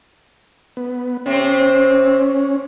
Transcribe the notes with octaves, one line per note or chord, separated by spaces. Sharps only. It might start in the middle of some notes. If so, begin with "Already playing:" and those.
B3
C3 C4 C#4